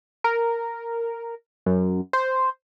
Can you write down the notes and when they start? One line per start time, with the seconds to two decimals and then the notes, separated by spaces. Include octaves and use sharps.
0.24 A#4
1.66 F#2
2.13 C5